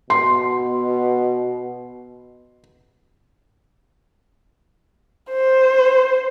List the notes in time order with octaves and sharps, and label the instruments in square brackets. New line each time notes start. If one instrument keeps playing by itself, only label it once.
[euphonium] B2 [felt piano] C6
[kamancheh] C5